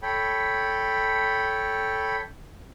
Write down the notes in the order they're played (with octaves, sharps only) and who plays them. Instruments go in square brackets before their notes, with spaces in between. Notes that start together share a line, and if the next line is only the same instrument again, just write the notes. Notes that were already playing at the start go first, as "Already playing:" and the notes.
[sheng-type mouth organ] A4 C#5 G5 B5